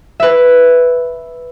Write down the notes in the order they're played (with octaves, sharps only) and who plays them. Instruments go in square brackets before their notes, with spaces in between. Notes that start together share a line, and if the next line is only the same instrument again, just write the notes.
[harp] B4 E5